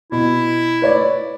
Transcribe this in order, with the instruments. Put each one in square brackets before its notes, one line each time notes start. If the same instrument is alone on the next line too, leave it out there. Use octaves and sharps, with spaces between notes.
[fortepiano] B2 [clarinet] E4
[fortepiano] B4 C#5 D5